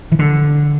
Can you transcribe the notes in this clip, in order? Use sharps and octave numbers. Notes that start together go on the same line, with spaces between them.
E3
D3